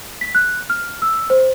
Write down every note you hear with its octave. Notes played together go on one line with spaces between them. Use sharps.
B6
F#6
F6
E6
C5